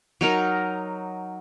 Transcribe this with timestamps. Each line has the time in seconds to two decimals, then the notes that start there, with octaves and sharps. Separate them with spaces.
0.21 F#3 D#4 A#4